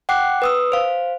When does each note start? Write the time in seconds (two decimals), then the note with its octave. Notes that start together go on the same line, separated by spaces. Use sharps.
0.09 F#5 G5 D6 F#6 C7
0.42 B4 D#6 E6
0.72 C5 F5